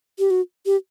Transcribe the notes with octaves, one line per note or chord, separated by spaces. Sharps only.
G4
F#4
G4